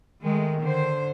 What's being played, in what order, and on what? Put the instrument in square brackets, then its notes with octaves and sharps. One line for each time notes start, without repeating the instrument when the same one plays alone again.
[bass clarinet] D#3 [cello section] G#3 A3
[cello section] D3 C5